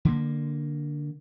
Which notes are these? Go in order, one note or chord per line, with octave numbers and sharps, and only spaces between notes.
D3 A#3